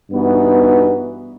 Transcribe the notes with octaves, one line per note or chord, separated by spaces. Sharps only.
G2 E3 B3 D#4 F#4